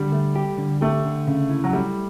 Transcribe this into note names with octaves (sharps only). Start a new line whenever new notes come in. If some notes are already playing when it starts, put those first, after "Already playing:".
Already playing: D3 G3
A3
G4
D3
A3 G4
D3
C#3
E4
F#3
G3 A3